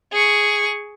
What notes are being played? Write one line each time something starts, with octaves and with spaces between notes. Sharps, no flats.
G#4 C#6